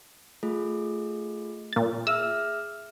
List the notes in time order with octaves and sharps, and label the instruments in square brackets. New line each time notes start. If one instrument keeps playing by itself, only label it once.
[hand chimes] A3 F4 G#4
[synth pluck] A#2 A6
[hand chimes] G#4 E5 F6 [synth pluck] E6